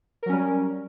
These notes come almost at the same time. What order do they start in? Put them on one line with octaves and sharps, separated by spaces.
A#4 F#3 C#4 G3